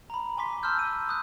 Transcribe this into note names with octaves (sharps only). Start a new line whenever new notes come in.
A#5 B5
G#5 C6 D6 B6
A5 C6 E6 F6 G6
D#7
D#6 F#6